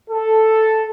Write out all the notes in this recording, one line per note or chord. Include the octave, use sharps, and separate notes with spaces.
A4